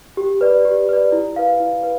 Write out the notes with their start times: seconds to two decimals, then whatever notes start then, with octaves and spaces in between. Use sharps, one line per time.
0.17 G4
0.41 B4 D5
0.65 G4
0.89 B4 D5
1.12 E4
1.36 B4 F5
1.60 E4
1.84 B4